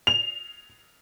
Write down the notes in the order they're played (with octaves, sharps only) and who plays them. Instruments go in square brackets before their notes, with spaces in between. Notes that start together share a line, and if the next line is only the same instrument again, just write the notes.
[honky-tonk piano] F7